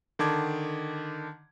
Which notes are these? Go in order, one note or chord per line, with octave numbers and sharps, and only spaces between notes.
D3 D#3 A5 D6 G#6